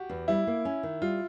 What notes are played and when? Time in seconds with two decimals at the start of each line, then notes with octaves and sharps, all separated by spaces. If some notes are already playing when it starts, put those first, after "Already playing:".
Already playing: F#4 G4
0.09 E2
0.28 G3 E4
0.47 A#3
0.65 C#4
0.83 D#3
1.02 G3 F4